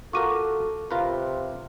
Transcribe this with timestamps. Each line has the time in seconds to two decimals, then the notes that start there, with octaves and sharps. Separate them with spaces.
0.13 F4 F#4 A4 A#4 C#6 D6 D#7
0.91 C3 F4 A#4 B4